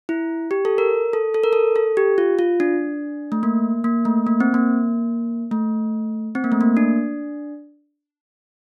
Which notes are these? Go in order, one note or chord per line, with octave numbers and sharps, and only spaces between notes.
E4
G4
A4
A#4
A4
A4
A#4
A4
A4
G4
F4
F4
D4
A3
A#3
A#3
A3
A#3
C4
A#3
A3
C4
A#3
A3
A#3
D4